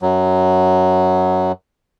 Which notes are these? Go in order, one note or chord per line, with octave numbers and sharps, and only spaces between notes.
F#2 F#3